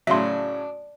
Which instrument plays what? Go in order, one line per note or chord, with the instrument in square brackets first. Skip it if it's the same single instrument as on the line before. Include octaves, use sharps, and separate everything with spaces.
[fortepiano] A2 C#3 F#3 [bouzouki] D4 [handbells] E5 C6